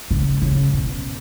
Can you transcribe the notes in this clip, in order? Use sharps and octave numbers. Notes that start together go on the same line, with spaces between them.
C#3
C#3
B2